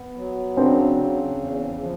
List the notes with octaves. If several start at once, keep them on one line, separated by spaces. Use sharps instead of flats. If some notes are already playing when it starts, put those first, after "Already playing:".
Already playing: B3
F#3
C#3 C4 D4
C#3
E2
F3